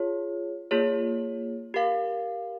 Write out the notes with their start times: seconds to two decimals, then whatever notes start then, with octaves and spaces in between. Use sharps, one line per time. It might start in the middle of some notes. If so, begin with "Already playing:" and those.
Already playing: F4 G#4 C#5
0.71 A#3 F4 G#4 C#5
1.74 G4 A#4 F5